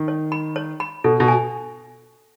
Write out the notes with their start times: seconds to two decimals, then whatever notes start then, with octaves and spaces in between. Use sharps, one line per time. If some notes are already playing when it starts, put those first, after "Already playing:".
Already playing: D#3
0.08 C#5
0.32 B5
0.56 C#5
0.80 B5
1.04 B2 A4
1.20 B2
1.28 G#5